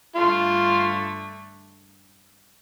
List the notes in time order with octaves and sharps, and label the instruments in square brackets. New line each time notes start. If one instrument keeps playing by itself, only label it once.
[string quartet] G2 D3 A3 [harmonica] F4